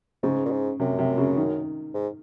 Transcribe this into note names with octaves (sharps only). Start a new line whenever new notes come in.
G#2 C#3
A#2
G#2
F#2 C3
C3
C#3
D#3
G#2